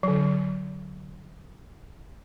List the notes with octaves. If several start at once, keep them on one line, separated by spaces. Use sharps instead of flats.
D3 F#3